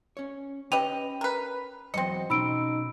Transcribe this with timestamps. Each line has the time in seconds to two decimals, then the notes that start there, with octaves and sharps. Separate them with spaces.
0.17 C#4 C#5
0.72 C#4 G4 B4 D#5 G5 D#7 F7
1.21 A#4 B4
1.94 E2 F#3 C4 D#5 C#7
2.30 B2 C#4 D#4 B5 C6 E6 D7